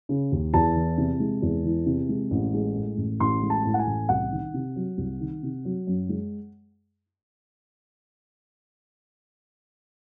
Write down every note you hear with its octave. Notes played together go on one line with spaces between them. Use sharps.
C#3
D#2
E2 A5
E3
C3
G#3
E2
E3
C3
G#3
A1
G#3
A2
A1
A1 C6
G#3
A5
A2
F#5
G#5
A1
C2 F#5
D#3
C3
F#3
C2
D#3
C3
F#3
F#2
G#3